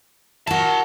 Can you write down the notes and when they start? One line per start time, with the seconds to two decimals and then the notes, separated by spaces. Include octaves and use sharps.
0.47 E4 F#4 A#4 A5